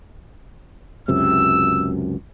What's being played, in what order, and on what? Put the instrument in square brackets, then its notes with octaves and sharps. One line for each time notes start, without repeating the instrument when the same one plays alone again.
[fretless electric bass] C#2 F#2 C3 [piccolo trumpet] E6